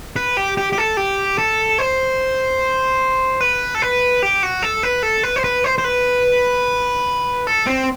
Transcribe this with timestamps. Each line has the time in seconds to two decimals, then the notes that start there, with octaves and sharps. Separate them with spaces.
0.16 B4
0.37 G4
0.57 G4
0.73 G4
0.78 A4
0.97 G4
1.38 A4
1.78 C5
3.41 B4
3.75 A4
3.82 B4
4.22 G4
4.43 F#4
4.63 A4
4.83 B4
5.03 A4
5.23 B4
5.36 C5
5.44 B4
5.64 C5
5.78 C5
5.84 B4
7.47 A4
7.67 C4